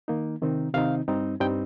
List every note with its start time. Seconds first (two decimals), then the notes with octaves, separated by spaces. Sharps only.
0.08 D#3 A#3 D#4
0.42 C3 D#3 C4 D#4
0.74 C3 D#3 C4 D#4 F5
1.08 G2 G3 C4 D#4
1.40 G2 G3 C4 D#4 G5